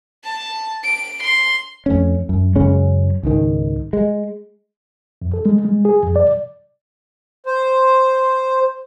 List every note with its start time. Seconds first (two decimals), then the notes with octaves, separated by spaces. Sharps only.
0.24 A5
0.83 D7
1.23 C6
1.86 F2 A3 C#4
2.29 F#2
2.56 F#2 C#3 G#3 C#4
3.23 C#2 G#2 D#3
3.93 G#3
5.22 F2
5.34 A4
5.46 G#3
5.65 G#3
5.85 G#4
6.02 F2
6.16 D5
7.46 C5